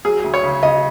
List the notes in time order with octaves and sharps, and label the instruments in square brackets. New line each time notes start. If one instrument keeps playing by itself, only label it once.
[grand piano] F#3 [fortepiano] G#4
[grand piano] D2
[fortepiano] C#5
[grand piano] C#3
[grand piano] C#3 [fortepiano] D#5